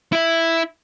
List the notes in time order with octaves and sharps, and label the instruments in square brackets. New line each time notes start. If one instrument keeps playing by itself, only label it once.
[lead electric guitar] E4 E5